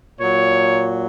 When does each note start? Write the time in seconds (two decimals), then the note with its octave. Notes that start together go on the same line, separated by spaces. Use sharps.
0.18 A#2 F#3 C#5